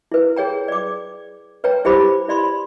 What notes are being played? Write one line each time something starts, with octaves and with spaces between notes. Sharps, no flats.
E4 B4
G#4 C#5 G5 A#5
D5 D6
B4 C#5 G5 A#5
E4 G4 C5 B5 D6
E4 D5 B5 C6